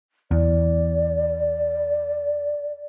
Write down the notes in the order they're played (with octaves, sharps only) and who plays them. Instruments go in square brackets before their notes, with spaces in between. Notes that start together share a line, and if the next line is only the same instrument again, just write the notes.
[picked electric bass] E2 [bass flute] D5